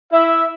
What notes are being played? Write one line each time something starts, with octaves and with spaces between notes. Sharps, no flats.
E4 E5